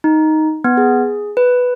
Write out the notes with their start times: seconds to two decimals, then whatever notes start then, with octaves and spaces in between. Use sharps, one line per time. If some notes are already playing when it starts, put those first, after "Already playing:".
0.04 D#4
0.64 B3
0.77 G#4
1.37 B4